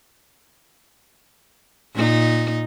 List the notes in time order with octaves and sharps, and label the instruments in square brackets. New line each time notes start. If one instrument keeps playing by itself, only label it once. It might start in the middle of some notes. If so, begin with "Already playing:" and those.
[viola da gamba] A#2 D#4